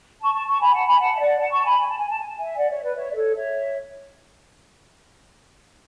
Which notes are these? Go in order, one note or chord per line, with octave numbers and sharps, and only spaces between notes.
A5 C#6
A5 C#6
A5 C#6
G#5 B5
F#5 A5
G#5 B5
F#5 A5
E5
D5 F#5
F#5 A5
A5 C#6
G#5 B5
G#5
A5
G#5
A5
G#5
A5
E5 G#5
D5 F#5
C#5 E5
B4 D5
C#5 E5
D5
A4 C#5
C#5 E5